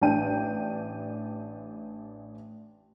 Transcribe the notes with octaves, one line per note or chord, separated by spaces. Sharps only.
A1 D4 D5 G5 D#7